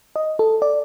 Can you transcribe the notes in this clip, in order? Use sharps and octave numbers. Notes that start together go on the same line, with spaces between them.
D#5
A4
D5